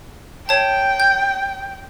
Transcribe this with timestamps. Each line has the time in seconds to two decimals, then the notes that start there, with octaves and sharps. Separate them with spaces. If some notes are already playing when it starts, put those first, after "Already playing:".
0.49 C#5 G5 A5
1.00 G6